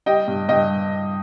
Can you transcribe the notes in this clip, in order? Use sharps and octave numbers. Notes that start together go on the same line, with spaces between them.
G3 D#5 G5
G2
G2 D#5 G5